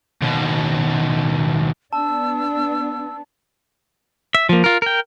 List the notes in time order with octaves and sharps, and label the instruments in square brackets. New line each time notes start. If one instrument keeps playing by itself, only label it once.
[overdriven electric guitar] D#2 B2
[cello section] B3 D4 [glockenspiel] A5 [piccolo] E6
[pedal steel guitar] E5
F3 A#3
F4 A#4
A#4 G5